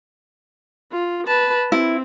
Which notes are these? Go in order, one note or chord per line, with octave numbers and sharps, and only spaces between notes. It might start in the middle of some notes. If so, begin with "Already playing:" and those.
F4
B4 A5
C4 E4